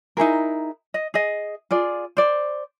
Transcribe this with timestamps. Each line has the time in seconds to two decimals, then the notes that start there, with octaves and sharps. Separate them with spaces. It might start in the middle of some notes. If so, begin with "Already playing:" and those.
0.17 D#4 E4 G#4 A#4
0.94 D#5
1.14 G#4 D#5
1.71 F4 G#4 D5
2.17 C5 D5